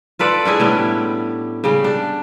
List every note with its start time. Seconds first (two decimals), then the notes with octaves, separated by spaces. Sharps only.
0.19 F4 A4 B4 D5
0.45 C#4 D4 E4 G#4
0.60 A2 G3 B3
1.64 C#3 G3
1.84 D4